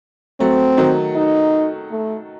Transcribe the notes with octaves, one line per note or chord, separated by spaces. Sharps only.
F#3 A3 C4
D#3 F#3
D#4
A3